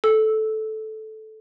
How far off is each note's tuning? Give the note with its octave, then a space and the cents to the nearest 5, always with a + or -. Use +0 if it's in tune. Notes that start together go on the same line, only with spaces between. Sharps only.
A4 -10 E6 +0